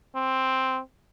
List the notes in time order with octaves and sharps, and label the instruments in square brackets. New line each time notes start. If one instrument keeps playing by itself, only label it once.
[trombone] C4